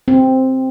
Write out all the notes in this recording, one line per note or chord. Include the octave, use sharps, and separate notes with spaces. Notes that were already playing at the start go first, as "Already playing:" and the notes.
C4